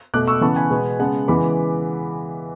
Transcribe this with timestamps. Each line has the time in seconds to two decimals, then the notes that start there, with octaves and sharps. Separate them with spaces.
0.14 B2 A3 D6 F#6
0.28 C#6 E6
0.41 C#3 E3 B3 A5 C#6
0.56 G#5 B5
0.71 B2 G#3 B3
0.99 C#3 G#3 B3 F#5 A5
1.28 C#3 E3 G#3 B3 B5 D6